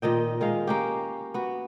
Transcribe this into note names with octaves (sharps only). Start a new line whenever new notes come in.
A#2 D#3 D#5 G5
D#3 G#3 F5
A#3 C#4 G4
B3 F#4